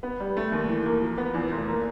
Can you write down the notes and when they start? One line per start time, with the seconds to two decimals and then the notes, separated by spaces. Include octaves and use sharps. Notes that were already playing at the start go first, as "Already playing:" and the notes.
0.03 B3
0.20 G3
0.37 A3
0.52 D#2
0.68 E3
0.86 A#3
1.02 F3
1.18 B3
1.34 E2
1.52 F1
1.67 A#3